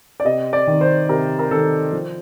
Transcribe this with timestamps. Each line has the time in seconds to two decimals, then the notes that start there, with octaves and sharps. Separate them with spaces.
0.20 D5
0.25 C3 D#5
0.53 D5
0.67 D#3
0.81 C5
1.09 C3 A#4
1.39 A#4
1.51 D#3 A4
1.93 F3